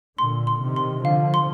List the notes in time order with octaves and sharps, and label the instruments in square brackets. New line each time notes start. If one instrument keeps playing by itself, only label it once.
[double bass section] A#2 D3 [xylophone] C6
[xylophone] C6
[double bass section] C3 D#3
[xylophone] C6
[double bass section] D3 F3 [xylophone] F5
[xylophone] C6